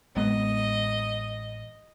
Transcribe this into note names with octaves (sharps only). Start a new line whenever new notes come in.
A1 G#3 B3 D#5